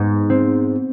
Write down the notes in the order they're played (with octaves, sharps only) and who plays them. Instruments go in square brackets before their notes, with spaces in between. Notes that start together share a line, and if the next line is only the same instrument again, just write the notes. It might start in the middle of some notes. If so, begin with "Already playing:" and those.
Already playing: [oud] G#2 [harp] B3
[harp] C4